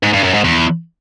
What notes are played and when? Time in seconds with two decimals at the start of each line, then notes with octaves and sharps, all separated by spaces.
0.03 G#2
0.13 G2
0.24 F#2
0.34 G#2
0.44 E2